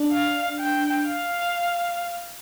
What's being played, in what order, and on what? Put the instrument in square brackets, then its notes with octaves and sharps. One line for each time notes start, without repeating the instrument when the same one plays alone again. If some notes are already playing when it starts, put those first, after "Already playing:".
Already playing: [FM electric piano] D4
[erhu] F5
G5
F5